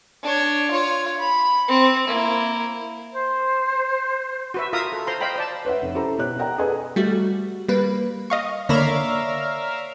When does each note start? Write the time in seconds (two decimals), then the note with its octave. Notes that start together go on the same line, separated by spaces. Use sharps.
0.23 D4 C#5
0.71 F4 C#5
1.19 B5
1.68 C4
2.08 A#3 E4
3.13 C5
4.54 F#4 B4 E5
4.73 F4 A#4 E5 F5 A#5 D#6
4.92 A4
5.07 C5 A#5 C6
5.21 C5 D#5 F5 G5 B5
5.36 C5 D5 A5
5.65 B4 C#5 E5 F#5
5.82 F1
5.94 C#4 E4 G4 A4 C5 A#5
6.19 B2 G4 C#5 F#6
6.39 A#4 D5 D#5 F#5 G5 A#5
6.58 G#4 A4 B4 D#5 G#5
6.96 G3 A3 F#4
7.68 G3 A#3 B4
8.30 D#5 F5 C#6
8.69 D3 A#3 A#4 C#5 D5 E5 F5 B5